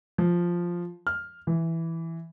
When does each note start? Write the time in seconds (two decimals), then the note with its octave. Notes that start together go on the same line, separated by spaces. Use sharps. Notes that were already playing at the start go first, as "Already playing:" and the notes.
0.18 F3
1.07 F6
1.47 E3